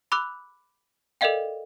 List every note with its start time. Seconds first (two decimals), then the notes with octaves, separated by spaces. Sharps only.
0.12 B5 D6 E6 F#6
1.21 A4 A#4 D5 D#5 F5 G5